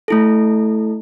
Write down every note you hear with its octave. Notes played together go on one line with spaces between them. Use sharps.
A3 E4 A4